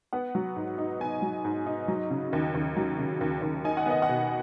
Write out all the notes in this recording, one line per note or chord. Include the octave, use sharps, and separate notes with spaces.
B3 F#5
F#3
G#2
D#4
B3 G#5
F#3
G#2
D#4
F#3
C#3
D#2
D#2
F#3
C#3
D#2
D#2
D#4 G#5
F#5
B3 D#5
F#5
B2